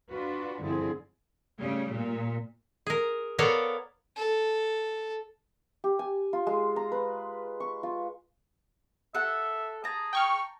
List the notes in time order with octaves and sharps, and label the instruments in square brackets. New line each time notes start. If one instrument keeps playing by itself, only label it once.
[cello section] D4 F4 F#4 B4
G2 D3 F3 C4 E4 G#4
C#3 G3 A3
A#2
[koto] G#4 A#4
B3 A4 A#4 C#5 D5 F5
[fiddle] A4
[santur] G4
G#5
F4
G#3
A#5
B4
C#6
F4
[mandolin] A4 F#5 [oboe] E5
[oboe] G#4 [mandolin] A5 A#5
[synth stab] G5 C#6 F6